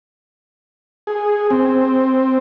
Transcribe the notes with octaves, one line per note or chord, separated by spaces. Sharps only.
G#4
C4